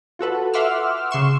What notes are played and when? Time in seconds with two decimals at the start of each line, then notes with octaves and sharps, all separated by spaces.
0.19 F4 F#4 A4 B4
0.54 E5 F#5 C6 D6 E6 F6
1.11 C#3 C6 C#6 E7